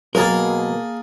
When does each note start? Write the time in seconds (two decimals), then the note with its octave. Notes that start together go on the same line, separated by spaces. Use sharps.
0.15 B2 F#3 A#3 G#4 A#4 A5